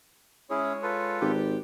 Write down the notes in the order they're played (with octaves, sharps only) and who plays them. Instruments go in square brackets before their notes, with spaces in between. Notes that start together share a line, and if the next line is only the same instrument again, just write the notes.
[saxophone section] G#3 C#5 [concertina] C#4 E4 G#4
[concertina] F4 A4 B4
[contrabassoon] G#1 [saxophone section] G4